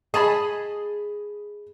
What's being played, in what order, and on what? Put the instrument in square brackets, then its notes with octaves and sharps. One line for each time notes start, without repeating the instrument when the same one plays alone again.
[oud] G#4 [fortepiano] D#5 A5 B5